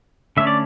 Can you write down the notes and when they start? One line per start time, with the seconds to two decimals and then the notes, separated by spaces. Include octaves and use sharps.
0.37 D3 A3 C#4 E5
0.47 D5